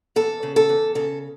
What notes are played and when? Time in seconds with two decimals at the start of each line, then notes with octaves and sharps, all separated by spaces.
0.16 E2 A4
0.43 C#3
0.56 A4
0.69 E2
0.95 C#3 A4